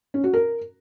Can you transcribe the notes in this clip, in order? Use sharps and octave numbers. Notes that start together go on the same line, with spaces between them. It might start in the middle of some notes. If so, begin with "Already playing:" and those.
C#4
F#4
A#4